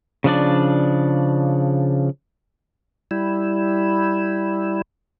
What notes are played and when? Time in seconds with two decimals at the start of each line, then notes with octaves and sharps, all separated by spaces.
0.24 C#3 F3 D4 D5
3.11 G3 E4